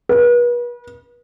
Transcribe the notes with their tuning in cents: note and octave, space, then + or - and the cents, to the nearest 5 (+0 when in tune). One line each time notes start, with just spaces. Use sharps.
B4 -40